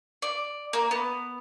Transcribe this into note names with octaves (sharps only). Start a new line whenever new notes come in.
D5
A#3
B3